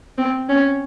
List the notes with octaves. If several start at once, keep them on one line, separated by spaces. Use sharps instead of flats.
C4
C#4